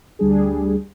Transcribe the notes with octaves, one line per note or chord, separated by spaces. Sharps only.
D2 G3 D4 G#4